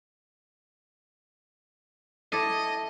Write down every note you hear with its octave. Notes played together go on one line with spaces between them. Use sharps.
E4 A4 D5 D#5